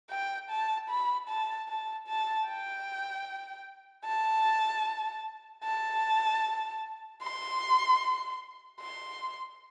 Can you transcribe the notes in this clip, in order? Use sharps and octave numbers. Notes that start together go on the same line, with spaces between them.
G5
A5
B5
A5
A5
A5
G5
A5
A5
C6
C6